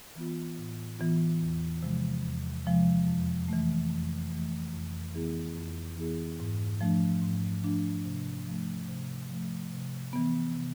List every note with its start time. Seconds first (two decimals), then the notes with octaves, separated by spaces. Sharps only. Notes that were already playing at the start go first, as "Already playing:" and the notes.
0.16 E3 B3 F4
0.58 A2
0.99 E3 B3 F4
1.41 E2
1.83 C3 F3 G#3
2.24 E2
2.66 C3 F3 G#3
3.07 F2
3.48 E3 A3
3.90 F2
4.32 E3 A3
4.73 F2
5.14 E3 B3 E4 G#4
5.56 F2
5.98 E3 B3 E4 G#4
6.40 G#2
6.81 F3 A3 D4
7.22 G#2
7.63 F3 A3 D4
8.05 C3
8.47 F3 A3
8.88 C3
9.30 F3 A3
9.72 C3
10.13 E3 B3
10.55 C3